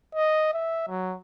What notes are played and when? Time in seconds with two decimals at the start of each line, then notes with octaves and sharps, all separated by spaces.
0.15 D#5
0.54 E5
0.88 F#3